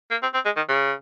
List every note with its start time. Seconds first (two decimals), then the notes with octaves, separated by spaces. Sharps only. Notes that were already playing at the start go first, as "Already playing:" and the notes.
0.11 A#3
0.23 C4
0.34 C4
0.45 G#3
0.57 D#3
0.68 C#3